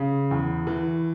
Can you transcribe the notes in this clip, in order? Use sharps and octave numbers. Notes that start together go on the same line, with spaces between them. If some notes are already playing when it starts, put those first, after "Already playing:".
Already playing: C#3
E2
E3